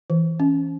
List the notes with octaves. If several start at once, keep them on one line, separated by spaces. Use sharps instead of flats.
E3
C#4